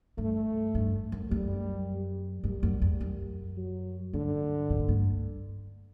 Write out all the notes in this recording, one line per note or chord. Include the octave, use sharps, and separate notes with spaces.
G2 A3
G2
F#2
F#2 G3
F#2 G3
F#2
E2
F#2
F#3
G2 D3
G2
A2
G2